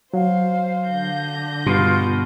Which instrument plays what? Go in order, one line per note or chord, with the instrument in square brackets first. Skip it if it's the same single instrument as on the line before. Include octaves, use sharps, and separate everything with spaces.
[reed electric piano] F#3 [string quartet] C5 [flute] F5
[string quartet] D3 G6 A#6
[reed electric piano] G2 C6 [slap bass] B2 [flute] F4